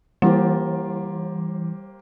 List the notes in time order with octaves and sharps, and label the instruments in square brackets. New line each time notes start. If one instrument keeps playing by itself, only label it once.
[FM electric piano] E3 [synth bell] G3 [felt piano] A#3 G4 C5